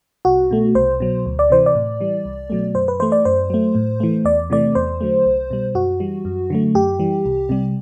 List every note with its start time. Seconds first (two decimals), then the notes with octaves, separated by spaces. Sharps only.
0.25 C2 F#4
0.51 B2 A3
0.75 C2 C5
1.00 B2 F#3
1.26 D2
1.39 D5
1.50 C3 E3 C5
1.66 D5
1.75 A2
2.01 E3 G3
2.25 C2
2.50 B2 F#3 A3
2.75 F#2 C5
2.88 B4
3.00 E3 A3 C5
3.12 D5
3.25 F#2 C5
3.50 F#3 A3
3.75 A2
4.00 E3 A3
4.25 E2 D5
4.50 C3 E3 A3 D5
4.75 E2 C5
5.01 D3 F#3 A3
5.26 C2
5.51 B2 G3
5.75 F#2 F#4
6.00 E3 G3
6.25 F#2
6.50 D3 F#3 A3
6.75 F#2 G4
7.00 E3 G3
7.25 C2
7.49 C3 G3